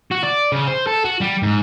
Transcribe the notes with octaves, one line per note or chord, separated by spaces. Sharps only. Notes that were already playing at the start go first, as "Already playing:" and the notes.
F#4
D5
C#3
C5
A4
F#4
G3
G#2